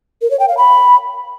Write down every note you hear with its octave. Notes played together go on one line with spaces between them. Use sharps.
A#4
C#5
G5
F5
B5